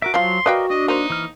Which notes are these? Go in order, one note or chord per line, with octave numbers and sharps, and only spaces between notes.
F#4 A#4 E5 D6
F3 F#3 F4 C6
F#4 A#4 B4 D5 D#5 F5 G5
D4 D#5
A#3 D#4 C5
E3 F6